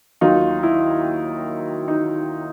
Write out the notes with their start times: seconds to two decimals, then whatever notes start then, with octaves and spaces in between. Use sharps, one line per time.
0.21 D#2 D#3 F#3 D#4 F4
0.63 E4
1.88 D#4